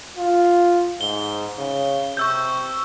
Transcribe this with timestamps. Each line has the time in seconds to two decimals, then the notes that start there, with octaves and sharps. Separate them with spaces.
0.18 F4
1.01 G#2 G7
1.59 C#3
2.17 C3 C#6 E6 G6